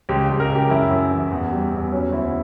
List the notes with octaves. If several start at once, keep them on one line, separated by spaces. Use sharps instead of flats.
C#2 G4
C#2
A#4
C#3
G4
F#2 E4
F#2
E3
E2
G3
E2
F#3 C#4
D2 E4